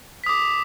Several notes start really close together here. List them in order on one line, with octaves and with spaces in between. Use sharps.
B6 D#6 D6